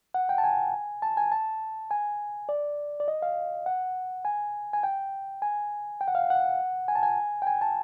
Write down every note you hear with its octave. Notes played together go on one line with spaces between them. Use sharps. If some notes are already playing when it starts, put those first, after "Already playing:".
F#5
G5
A5
G#5
A5
G#5
A5
G#5
D5
D5
D#5
F5
F#5
G#5
G#5
G5
G#5
G5
F#5
F5
F#5
G#5
A5
G#5
G5
G#5
A5